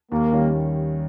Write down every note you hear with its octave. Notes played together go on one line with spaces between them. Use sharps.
D#2 A#3
D#3 G3 C#4